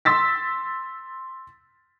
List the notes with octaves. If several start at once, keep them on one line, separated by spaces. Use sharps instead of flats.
C6 E6 A6 B6